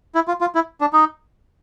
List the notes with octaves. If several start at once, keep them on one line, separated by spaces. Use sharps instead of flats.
E4
F4
F4
E4
D4
D#4